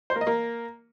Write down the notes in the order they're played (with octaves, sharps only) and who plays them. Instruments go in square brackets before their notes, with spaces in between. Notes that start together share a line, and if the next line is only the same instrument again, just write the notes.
[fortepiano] C5
A#3
D#5
A#3